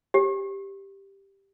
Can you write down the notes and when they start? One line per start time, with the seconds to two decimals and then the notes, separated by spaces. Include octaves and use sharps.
0.14 G4